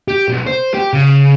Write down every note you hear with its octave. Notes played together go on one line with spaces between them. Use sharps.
G4
B1
C5
G4
C#3